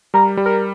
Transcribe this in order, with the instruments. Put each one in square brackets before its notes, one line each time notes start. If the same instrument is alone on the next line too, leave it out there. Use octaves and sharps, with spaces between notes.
[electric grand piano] G3 [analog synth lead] A#4
[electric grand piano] G3
[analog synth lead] A#4